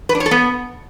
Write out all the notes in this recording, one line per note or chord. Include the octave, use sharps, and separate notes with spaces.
B4
D4
C#5
A4
B3